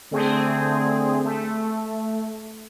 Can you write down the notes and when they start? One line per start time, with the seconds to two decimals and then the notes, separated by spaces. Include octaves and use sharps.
0.11 D3 A3 C4 G#4
1.25 A3